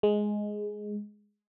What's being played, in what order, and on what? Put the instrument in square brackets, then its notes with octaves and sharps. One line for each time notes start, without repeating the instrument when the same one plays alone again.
[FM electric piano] G#3